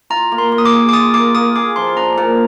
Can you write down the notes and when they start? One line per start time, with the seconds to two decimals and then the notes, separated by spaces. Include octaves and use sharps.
0.10 F4 A#5
0.32 A#3
0.38 C6
0.52 A#3
0.58 D#6
0.65 D6
0.73 G#4
0.89 D6
0.93 F4 D#6
1.14 A#3 D6
1.35 A#3 D#6
1.55 G#4 D6
1.76 F3 C6
1.97 D4 A#5
2.18 A#2 A#5